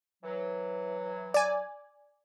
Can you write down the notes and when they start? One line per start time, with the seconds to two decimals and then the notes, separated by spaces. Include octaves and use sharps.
0.23 E3 F#3
1.34 D5 G#5